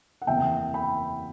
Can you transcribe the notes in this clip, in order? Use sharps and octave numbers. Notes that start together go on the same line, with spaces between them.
F#5
F#1 E2 C3 E3 B3 E5 G5
G5 B5